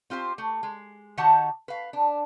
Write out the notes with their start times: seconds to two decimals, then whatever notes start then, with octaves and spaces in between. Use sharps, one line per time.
0.10 C4 F4 G4 C5
0.38 A3
0.63 G#3
1.18 D#3 D#4 F#4 G4 F#5 A5
1.68 B4 F5
1.93 D4